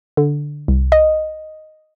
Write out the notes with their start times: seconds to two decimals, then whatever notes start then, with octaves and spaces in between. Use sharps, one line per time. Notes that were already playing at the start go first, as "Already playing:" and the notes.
0.17 D3
0.68 C2
0.92 D#5